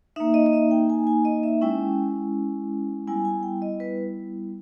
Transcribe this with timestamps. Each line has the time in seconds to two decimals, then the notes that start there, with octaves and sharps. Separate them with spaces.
0.16 A#3 D#4 E5
0.34 D#5
0.46 D#5
0.53 E5
0.71 G5
0.90 G#5
1.07 G#5
1.25 D#5
1.43 E5
1.61 G#3 C#4 E4 G5
3.07 G3 B3 E4 G#5
3.25 G#5
3.43 G5
3.62 D#5
3.80 B4